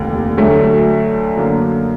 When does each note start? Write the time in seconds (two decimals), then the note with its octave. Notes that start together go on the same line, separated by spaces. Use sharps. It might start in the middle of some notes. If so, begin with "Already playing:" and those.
Already playing: F1 D#2 D3
0.38 D2 D3 F#3 A3
1.37 F#2 D3 F#3 A#3